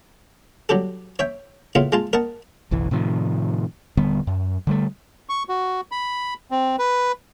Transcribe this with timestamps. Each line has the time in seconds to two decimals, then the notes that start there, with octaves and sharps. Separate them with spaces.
0.69 F#3 G3 G4 A4
1.19 C#5 E5 G5
1.75 A2 C#3 B3 E4 F4
1.92 G#3 F4 A5
2.13 A#4 D#5 F#5 A5
2.71 F#1 B1 E3
2.91 A2 C3 D#3 F3
3.97 D#1 D3 G3 B3
4.27 F#2
4.67 D3 G3 A3
5.29 C#6
5.49 F#4
5.91 B5
6.51 C4
6.79 B4